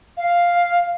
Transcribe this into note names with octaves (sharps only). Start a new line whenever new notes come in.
F5